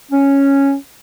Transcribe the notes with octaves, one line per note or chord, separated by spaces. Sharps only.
C#4